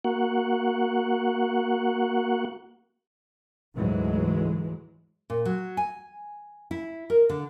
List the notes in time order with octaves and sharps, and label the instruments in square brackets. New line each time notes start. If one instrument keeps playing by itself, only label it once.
[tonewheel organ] A#3 F#4 F#5
[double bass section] D2 G#2 E3 F#3 G#3
[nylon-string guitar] A#2
F#3
G#5
E4
A#4
D3